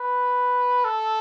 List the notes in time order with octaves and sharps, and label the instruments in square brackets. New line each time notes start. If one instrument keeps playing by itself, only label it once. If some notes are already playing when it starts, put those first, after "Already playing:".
Already playing: [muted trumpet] B4
A4